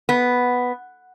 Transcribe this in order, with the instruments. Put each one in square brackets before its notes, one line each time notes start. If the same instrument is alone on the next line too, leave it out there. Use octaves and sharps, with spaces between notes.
[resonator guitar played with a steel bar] B3